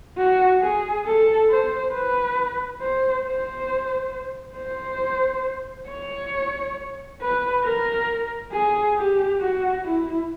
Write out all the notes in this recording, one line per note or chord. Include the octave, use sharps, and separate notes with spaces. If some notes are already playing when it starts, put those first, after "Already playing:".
F#4
G#4
A4
C5
B4
C5
C5
C5
C#5
B4
A#4
G#4
G4
F#4
E4